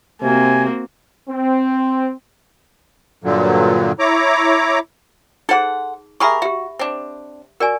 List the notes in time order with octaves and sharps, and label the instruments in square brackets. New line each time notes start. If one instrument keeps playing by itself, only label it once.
[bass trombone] C3 [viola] A#3 [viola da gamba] C4 F#4 [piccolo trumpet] G#5
[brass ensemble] C4
[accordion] G2 A#2 D3 F#3
E4 C#5 A#5 D6
[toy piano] D#4 G#4 [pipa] A4 C5 F#5
[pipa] G4 G#4 A#4 [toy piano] E5 B5 C#6
[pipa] F#4 [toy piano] G4 E5
[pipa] C4 D4
[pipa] F#4 [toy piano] A#4 D5 G#5